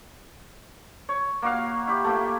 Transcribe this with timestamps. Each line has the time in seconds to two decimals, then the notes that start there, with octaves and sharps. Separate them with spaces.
1.09 C#5
1.42 A#3 F#4 F5
1.87 E4 G4
2.04 A3 A#3 E4